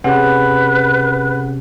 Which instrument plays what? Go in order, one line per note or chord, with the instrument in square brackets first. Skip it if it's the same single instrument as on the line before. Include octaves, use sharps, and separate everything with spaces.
[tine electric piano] C3 C#4 [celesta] G#4 F#5 [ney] B4